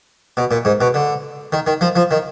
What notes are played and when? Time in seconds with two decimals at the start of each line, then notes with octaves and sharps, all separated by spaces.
0.37 B2
0.51 A#2
0.65 G#2
0.81 B2
0.94 D3
1.52 D#3
1.67 D#3
1.81 F3
1.96 F3
2.11 D#3